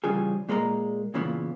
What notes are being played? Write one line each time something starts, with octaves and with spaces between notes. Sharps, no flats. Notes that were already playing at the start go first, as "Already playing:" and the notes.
C#3 E3 F3 G3 G#4
A#2 G#3 A#3 B4 D5 A#5
A#2 C#3 E3 F3 B3